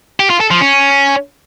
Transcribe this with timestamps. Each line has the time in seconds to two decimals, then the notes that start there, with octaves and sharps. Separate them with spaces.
0.20 G4
0.30 F4
0.40 A4
0.51 F3
0.61 C#4